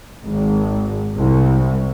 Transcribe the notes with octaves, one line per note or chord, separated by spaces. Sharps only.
G#1
C2